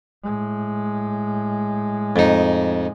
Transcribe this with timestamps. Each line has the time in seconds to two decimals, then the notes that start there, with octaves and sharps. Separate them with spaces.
0.24 A2 G#3
2.16 F2 D#4